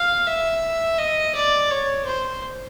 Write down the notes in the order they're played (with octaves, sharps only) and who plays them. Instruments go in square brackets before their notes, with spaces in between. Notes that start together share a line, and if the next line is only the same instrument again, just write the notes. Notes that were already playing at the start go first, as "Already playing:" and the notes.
Already playing: [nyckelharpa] F5
E5
D#5
D5
C#5
C5